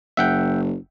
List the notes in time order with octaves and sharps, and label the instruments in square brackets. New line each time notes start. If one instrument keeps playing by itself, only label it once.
[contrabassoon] F#1 [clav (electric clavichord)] E5 F#5 G5